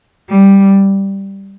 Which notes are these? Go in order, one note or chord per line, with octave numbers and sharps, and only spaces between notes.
G3